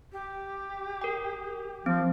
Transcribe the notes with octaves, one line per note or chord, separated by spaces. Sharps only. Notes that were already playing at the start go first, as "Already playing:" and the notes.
G4
A#4 G5
F3 C4